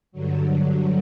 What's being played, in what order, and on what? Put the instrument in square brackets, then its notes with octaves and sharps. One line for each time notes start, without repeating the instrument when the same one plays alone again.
[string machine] G2 D3 F#3